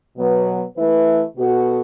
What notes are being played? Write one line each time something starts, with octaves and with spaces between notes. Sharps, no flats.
B2 F#3 B3
E3 A3 E4 B4
B2 B3 F#4 A4